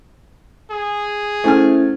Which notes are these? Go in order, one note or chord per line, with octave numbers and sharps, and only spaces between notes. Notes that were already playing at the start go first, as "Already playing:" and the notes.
G#4
A3 C#4 E4 C5 G#5 F6